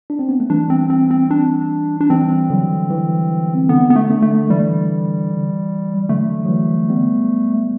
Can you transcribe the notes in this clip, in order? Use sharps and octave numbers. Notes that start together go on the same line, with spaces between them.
D4
C4
B3
A3
E3 G3 D4
C4
C4
C4
D4
D4
E3 G3 C4
D3 F#3
E3
D3 B3
B3
A3
D3
A3
E3 G3
D3 F#3 A3
F#3
E3 G3
G3 B3